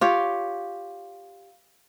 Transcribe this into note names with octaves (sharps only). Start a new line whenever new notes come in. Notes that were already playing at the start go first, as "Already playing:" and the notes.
F4 G4 C#5